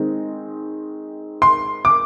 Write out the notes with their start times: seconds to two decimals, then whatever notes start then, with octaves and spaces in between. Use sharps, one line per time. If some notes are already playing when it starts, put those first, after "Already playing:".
Already playing: D#3 G#3 C4 D#4
1.42 C6
1.85 D6